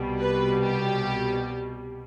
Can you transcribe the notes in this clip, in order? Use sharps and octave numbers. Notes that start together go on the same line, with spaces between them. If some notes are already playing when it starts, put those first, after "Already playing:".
Already playing: C2 B2 G3
B4
G4